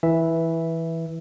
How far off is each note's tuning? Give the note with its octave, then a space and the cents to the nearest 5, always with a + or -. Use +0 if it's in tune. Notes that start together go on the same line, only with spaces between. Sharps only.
E3 -10 E5 +0